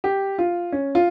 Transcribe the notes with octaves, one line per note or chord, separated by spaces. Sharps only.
G4
F4
C#4
F4